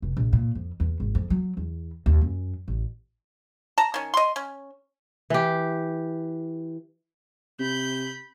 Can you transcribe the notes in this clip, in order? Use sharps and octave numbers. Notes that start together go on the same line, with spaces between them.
F1
A#1
A#2
F2
E2
G#1
F2
F#3
E2
D#2
F#2
A1
A5 A#5
D#3 C#4
D#5 C6
C#4
E3 G4
C3 B5 G6